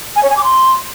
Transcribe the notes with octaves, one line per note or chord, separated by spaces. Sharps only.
G#5
C#5
G#5
D6
C6